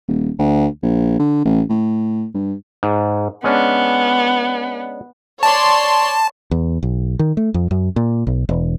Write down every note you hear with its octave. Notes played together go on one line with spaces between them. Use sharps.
D#1
D2
A#1
D3
A1
A2
G2
G#2
G#3 B3 C#4 D4
C#5 D5 A5 C6
E2
B1
D#3
A3
F2
F#2
A#2
B1
E1